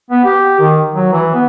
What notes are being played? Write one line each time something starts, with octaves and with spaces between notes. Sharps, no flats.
B3
G4
D#3
F#3
E3
B3